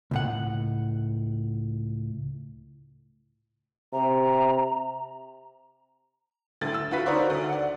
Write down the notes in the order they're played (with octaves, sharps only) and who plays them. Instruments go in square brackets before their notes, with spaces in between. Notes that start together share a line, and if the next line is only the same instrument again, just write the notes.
[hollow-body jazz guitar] C#2 A2 F#5
[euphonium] C3 [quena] A#5
[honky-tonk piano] D2 A2 A6
E6
D2 F4 F#4 B4 B6
D#4 F#4 A#4 C5 D5 C#6
D2
D5 F#5